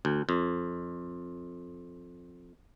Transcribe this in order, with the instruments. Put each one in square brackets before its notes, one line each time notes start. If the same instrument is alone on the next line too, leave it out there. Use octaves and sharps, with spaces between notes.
[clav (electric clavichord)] D2
F2